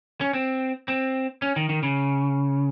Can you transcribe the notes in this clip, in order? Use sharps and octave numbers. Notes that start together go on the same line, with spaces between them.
C#4
C4
C4
C#4
D#3
D#3
C#3